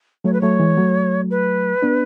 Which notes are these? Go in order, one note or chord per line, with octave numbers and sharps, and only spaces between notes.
F#3 A3 C#5
B4
F#3 A3 C#5
E3 G#3
F#3 A3
B4
B3 D4